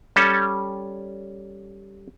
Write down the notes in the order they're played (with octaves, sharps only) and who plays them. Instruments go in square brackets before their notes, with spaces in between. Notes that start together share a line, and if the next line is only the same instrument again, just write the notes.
[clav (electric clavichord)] G3 C#4 A4